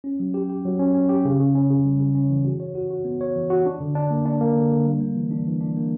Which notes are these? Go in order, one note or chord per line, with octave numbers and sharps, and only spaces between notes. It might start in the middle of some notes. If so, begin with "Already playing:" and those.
C#4
F#3
G4
G4
F#3
C#4
C#4
G4
C#3
C#3
C#4
C#3
G3
C#3
C#4
E3
F#4
C#5
F#4
F#4
B3
C#5
E3
F#4
D4
D3
D4
A#3
D4
A#3
D3
D3
G3
A#3
E3
D4
E3
D4
A#3